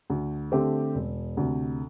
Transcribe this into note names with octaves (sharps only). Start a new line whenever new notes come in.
D2
D3 A3 C4 G4
E1
D2 C3